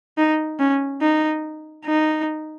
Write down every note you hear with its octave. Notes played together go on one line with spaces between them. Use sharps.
D#4
C#4
D#4
D#4